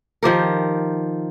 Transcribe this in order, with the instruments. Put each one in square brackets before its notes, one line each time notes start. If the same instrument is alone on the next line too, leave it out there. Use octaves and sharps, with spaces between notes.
[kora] D#3 F3 G4 A#4